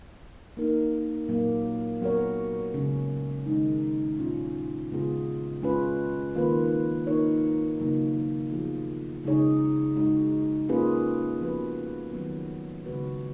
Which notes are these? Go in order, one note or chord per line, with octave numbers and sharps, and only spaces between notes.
A#3 D#4 A#4
A#2 F#3 A#3
F#3 B3 F#4 A#4 C#5
C#3 G#3 C#4
D#3 G#3 D#4
A#2 G#3 C#4 F4
C#3 G#3 B3 F4 G#4
G#3 C#4 F4 B4
D#3 A#3 F4 B4
A#3 D#4 A#4 C#5
C#3 F#3 A#3 D#4 F#4
F3 B3 F4 G#4
C#3 G#3 D#4 G#4 C#5
G#3 D#4 F#4
A#3 C#4 F4 G#4 B4
F3 B3 F#4 B4
D#3 F#3 B3
C#3 G#3 B3 F#4 B4